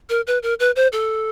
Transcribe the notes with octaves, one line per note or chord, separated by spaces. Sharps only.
A#4
B4
A#4
B4
C5
A4